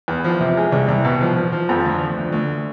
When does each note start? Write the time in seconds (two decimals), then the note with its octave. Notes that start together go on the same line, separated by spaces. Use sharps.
0.08 E2
0.24 F3
0.40 C3
0.57 G#3
0.72 C2
0.88 C2
1.05 B2
1.21 F3
1.36 F3
1.52 F3
1.69 F2
1.85 D2
2.01 F3
2.17 D2
2.32 D2